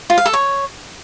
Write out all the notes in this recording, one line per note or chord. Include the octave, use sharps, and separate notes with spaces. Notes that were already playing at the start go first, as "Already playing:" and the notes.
F4
F5
A4
C#5